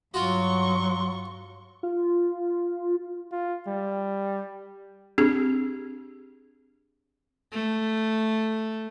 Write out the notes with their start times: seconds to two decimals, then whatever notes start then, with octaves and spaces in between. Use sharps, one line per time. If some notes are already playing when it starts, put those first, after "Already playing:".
0.14 G2 F#3 F4 F#4 C6 C#6
1.83 F4
3.32 F4
3.67 G3
5.18 C4 D4 G4 G#4
7.52 A3